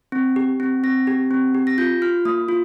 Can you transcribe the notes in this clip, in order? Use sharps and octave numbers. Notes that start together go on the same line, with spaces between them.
C4
G4
C4
C4 A#6
G4
C4
G4
A#6
F4 G6
F4 F6
A#3 D#6
F4